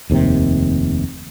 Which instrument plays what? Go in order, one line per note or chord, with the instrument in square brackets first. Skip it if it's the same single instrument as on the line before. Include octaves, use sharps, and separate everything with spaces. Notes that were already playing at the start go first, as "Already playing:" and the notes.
[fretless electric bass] F1 D#2 G#2 C3